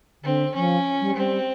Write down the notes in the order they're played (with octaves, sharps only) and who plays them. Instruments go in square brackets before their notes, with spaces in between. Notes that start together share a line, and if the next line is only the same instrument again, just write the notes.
[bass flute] D3 [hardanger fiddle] C4
[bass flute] F3 [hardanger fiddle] C#4
[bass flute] G3
[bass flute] G3 [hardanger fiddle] C4